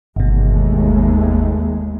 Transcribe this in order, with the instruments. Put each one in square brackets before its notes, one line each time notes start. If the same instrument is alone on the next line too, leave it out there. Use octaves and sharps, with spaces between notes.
[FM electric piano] G1 B2 [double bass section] D#2 G#3 A3